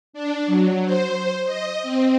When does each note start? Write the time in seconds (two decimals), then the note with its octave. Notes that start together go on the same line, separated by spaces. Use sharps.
0.13 D4
0.47 F#3
0.85 C5
1.45 D#5
1.83 C4